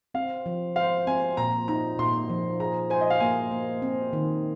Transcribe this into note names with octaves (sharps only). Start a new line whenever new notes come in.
C4 F5
F3
C5 F5
C4 G#5
A#2 A#5
D#4 A#5
A#2 C6
F3
G#4 A#5
C5 G#5
D#5
F5
A#3 G#5
A#3
C4
D#3